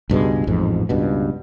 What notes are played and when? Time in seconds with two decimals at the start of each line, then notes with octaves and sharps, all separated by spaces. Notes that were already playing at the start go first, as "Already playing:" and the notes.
0.10 C#2 G2 B2 G#3
0.47 A1 F2 G#2
0.89 C#2 G2 B2